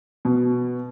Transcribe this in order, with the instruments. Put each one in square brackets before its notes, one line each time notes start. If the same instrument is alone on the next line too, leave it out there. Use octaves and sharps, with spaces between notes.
[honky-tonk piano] B2